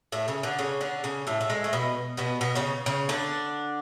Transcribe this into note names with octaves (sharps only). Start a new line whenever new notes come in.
A2 A3
C#3 C#4
D3 D4
C#3 C#4
D3 D4
C#3 C#4
A2 A3
A3
G#3
A3
B2 B3
B2 B3
B2 B3
C#3 C#4
C#3 C#4
D3 D4